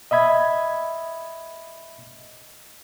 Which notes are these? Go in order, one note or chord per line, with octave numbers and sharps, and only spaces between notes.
D#5 E5 B5 G#6